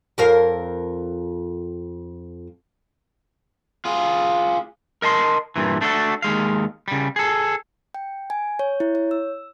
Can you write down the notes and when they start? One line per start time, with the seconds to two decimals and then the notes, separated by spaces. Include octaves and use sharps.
0.18 F2 A#4 F5
3.85 F4 G#4
5.02 A#4 D#5 A5 C6
5.56 G2 A#2 E3
5.81 A3 D4 F#4 G4 A4
6.22 D#2 G#3 F5
6.88 C#3 G3
7.16 G#4 A4
7.94 G5
8.30 G#5
8.59 C#5
8.80 E4
8.95 C#5
9.11 E6